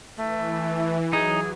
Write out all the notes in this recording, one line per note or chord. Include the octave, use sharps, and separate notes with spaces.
E3 A3
F#3 D#4 G#4